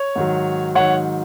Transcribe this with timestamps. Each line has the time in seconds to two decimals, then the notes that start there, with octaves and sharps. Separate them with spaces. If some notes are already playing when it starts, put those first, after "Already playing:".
Already playing: C#5
0.16 G#2 D#3 F#3
0.75 G#2 D#3 F#3 C#5 F#5